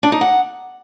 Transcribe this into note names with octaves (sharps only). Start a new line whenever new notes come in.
D4
D#4
F#5